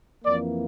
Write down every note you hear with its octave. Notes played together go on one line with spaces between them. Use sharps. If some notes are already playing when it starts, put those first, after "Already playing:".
F2 E3 A#3 D5